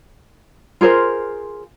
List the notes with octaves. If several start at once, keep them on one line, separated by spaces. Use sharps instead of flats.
F4 G#4 A#4 C5